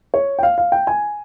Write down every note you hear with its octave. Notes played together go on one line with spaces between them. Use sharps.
C#5
G5
F5
F5
G5
G#5